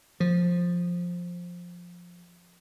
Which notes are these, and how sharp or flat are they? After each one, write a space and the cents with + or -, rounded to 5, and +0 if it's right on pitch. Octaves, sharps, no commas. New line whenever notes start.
F3 +10